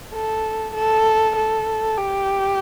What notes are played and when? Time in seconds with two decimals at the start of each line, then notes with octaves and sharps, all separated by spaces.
0.13 A4
0.74 A4
1.36 A4
1.98 G4